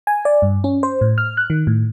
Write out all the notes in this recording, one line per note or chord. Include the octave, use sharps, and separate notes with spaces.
G#5
D5
G2
C#4
C5
A2
F6
F#6
D#3
A2